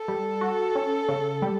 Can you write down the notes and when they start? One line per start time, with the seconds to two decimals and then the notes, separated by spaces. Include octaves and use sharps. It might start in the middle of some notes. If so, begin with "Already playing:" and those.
Already playing: A4
0.08 G3
0.41 F#4
0.75 C#4
1.09 C#3
1.42 G3